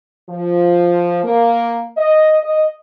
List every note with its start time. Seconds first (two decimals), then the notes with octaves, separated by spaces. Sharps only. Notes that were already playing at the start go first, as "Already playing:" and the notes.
0.29 F3
1.23 A#3
1.97 D#5
2.43 D#5